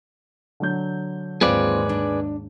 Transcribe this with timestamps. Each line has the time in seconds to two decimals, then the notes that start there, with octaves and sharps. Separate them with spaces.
0.60 D3 F#3 G6
1.41 D#2 G#2 C4 F4 G#4 B4 D5
1.89 D4